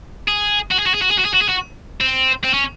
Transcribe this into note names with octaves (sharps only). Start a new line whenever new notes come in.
G#4
F#4
G#4
F#4
G#4
F#4
G#4
F#4
G#4
F#4
G#4
F#4
C4
C4
C#4